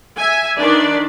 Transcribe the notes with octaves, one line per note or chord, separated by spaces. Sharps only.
E5 G#5
D#3 D4 B4 D5